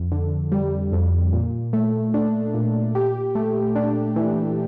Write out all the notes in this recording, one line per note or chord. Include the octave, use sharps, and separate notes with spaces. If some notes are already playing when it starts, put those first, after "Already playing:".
Already playing: F2
D3
G3
F2
A#2
A3
D4
A#2
G4
A3
D4
E3